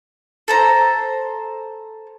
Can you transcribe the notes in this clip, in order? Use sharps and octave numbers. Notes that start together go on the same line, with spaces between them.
A4 C5 A#5